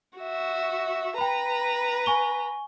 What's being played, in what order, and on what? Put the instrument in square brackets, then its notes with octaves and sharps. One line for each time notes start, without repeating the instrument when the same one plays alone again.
[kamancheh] F#4 E5
[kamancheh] B4 A#5 [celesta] G5 B5
[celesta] G#5 C#6 G7